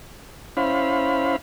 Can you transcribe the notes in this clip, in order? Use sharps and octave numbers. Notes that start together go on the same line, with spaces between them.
C#4 E4 C5 F5 B5